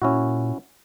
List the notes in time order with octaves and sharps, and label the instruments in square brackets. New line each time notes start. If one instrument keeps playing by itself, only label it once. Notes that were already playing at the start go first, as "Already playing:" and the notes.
[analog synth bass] A#2 [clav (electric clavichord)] C#4 E4 F#4